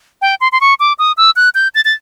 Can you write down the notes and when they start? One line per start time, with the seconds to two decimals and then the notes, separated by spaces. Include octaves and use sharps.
0.21 G5
0.41 C6
0.52 C6
0.61 C#6
0.80 D6
0.99 D#6
1.17 E6
1.36 F#6
1.55 G6
1.75 A6
1.85 A6